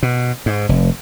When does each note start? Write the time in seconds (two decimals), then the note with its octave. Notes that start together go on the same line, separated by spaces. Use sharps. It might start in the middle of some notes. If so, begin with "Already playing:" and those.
0.03 B2
0.46 G#2
0.69 F1